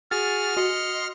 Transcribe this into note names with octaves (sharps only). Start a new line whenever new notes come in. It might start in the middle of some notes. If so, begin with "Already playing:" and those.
F#4 G#4 F6 A6
F#4 D#5 C6 C#7